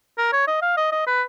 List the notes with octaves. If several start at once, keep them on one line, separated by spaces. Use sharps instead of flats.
A#4
C#5
D#5
F5
D#5
D#5
B4